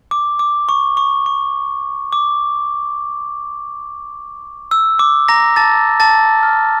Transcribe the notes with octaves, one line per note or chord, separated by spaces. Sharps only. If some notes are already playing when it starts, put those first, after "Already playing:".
D6
D6
C#6
C#6
C#6
D6
E6
D6
A#5 A#6
A5 A6
A5 A6
F6